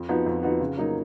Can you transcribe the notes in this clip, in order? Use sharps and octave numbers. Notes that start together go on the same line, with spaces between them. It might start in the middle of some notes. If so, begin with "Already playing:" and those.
Already playing: F2
F3 B3 D#4 F#4
F2
F3 B3 D#4 F#4
C#3
F#3 A#3 D#4